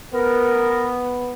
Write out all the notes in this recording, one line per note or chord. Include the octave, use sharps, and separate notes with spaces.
B3 A#4